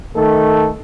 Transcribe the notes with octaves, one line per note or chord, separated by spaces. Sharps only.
D#3 A3 A4